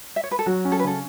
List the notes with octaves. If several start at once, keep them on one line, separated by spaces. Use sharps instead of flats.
E5
C#5
B4
A4
F#3 F#4
C#4
A4
B4
C#3 A4